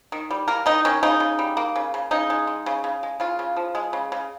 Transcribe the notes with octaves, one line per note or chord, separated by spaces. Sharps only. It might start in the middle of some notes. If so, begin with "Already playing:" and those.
D#3
G3
A#3 A#4
D#3 D#4
D#3 C#4
C#3 D#4
C#3
G3
A#3
C#3
C#3
C#3 D#4
G#3
G#3
C#3
C#3
G#3
C#3 F4
C#3
F3
G#3
C#3
C#3